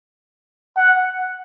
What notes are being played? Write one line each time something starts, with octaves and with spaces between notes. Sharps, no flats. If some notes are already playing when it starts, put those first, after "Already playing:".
F#5